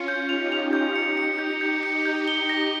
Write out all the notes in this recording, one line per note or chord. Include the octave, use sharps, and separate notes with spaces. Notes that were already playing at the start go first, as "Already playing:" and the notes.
Already playing: C#4 F4 C#7
G6
D#4 G4 F7
F7
G6
C#7
C#7
G6
G6
C#7
D#4 G4
G6
G7
A#6